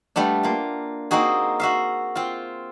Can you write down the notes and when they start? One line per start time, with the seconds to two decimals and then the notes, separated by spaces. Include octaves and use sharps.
0.16 G3 A3 B3 D4
0.43 A#3 F4
1.11 A#3 C4 D#4 F#4 G#4
1.60 F#4 E5 F5
2.15 C4 F4